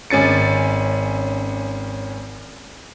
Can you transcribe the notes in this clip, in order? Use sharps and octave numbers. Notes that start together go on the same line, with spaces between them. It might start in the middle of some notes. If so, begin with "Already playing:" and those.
G#1 C#4 A6 C#7